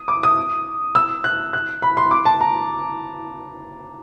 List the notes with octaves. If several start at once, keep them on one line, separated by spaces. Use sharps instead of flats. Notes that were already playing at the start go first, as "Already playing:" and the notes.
Already playing: D#6
D6
D#6
E6
F#6
F#6
B5
C6
D6
A5
A#5